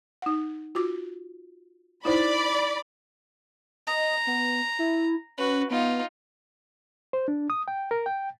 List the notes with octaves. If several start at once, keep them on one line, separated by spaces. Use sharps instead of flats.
D#4 F#5
F4 F#4 D6
D#4 E4 C5 D5 B5
D#5 A#5
B3
E4
C#4 F#4 B4
B3 D#4 F4
C5
D4
D#6
G5
A#4
G5